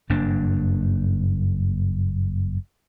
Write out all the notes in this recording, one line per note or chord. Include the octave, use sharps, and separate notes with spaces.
F#1 G2 A#3 D4